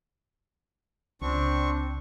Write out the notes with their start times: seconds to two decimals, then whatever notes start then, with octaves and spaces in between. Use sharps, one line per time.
1.21 C#2 C4 D4 C#6